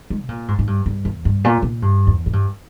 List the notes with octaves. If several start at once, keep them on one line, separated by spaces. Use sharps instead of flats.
G#3
B2
A#2
G#2
G#2
G2
G2
E2
G2
A#2
A#2
G2
E2
G#2
G2